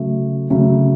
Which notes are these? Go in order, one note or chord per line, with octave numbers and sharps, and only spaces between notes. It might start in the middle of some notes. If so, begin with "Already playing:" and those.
Already playing: C#3 F#3 A3
C#3 F#3 A3